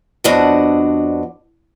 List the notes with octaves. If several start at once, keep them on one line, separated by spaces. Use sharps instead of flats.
F2 B3 D4 F#4 D#5 F#5